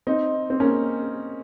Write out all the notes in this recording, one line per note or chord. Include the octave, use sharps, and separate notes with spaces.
C4 D#4
C4
A#3 C#4